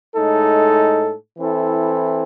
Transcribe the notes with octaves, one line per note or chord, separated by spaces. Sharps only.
A2 G#3 D#4 A4
E3 C4 E4 A4